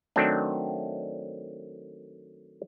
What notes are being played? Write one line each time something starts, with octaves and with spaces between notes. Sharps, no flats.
D#3 F#3 A3 C4 D4